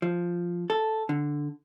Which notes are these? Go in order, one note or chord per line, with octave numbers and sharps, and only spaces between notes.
F3
A4
D3